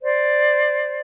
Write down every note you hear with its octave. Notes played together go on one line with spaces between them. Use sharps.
C5 D5